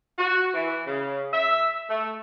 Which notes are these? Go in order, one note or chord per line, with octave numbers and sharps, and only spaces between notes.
F#4
E3
C#3
E5
A3